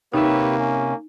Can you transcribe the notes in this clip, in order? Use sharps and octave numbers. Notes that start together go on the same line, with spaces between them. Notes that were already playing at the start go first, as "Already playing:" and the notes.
C3 A#3 D#4 G4 B4 C#5 E5
C#4